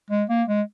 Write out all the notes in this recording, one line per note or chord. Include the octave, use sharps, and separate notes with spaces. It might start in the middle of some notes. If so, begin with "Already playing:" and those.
G#3
A#3
G#3